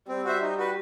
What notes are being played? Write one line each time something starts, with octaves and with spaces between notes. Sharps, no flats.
G3 C4
F#4 C5 E5
D#4
F#4 B4